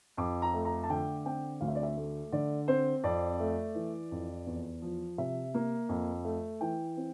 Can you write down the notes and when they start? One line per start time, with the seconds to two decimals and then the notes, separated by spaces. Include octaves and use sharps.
0.17 F2 D6
0.42 A#5
0.54 A3
0.65 A#5
0.83 A5
0.89 D3 G5
1.25 C4 G5
1.61 D2 F5
1.68 E5
1.75 D5
1.83 E5
1.97 A3
2.32 D3 D5
2.68 C4 C5
3.04 F2 D5
3.40 A3
3.75 E3
4.11 F2
4.46 E2
4.82 F3
5.18 C3 E5
5.54 A#3
5.89 F2
6.25 A3
6.61 E3 G5
6.97 C4